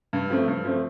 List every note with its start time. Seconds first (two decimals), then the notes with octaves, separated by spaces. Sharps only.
0.13 G2
0.30 F3 A3 C4
0.48 G2
0.64 F3 A3 C4